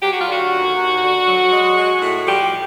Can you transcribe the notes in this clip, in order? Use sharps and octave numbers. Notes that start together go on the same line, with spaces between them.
F#3 G4
F#4
F4
D3 F#4
D#2
D#2
D3
F#3
G#3
G#3
A2
F3 G4